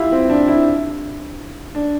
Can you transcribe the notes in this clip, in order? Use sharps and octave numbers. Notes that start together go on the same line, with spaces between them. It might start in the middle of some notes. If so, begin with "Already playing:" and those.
Already playing: E4 F4 G4
C4
D4
E4
D4